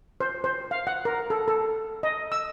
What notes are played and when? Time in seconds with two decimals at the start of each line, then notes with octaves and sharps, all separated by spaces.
0.20 C5
0.44 C5
0.71 F5
0.87 F#5
1.05 A#4
1.30 A4
1.48 A4
2.03 D#5
2.32 E6